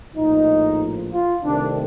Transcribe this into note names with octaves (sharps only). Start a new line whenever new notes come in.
A#1 A2 F3 D#4
F4
C2 C3 D#3 A3 C4 D4